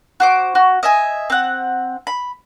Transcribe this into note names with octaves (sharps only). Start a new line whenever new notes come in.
F#4 C5 D6
F#4
D#5 E5 G#5
C4 F#5
B5